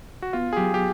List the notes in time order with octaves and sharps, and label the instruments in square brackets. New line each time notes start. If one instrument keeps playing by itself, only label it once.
[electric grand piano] F#4
[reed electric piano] B3 [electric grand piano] F4
[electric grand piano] G#4
[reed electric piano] F#3 [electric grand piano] G4
[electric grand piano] G4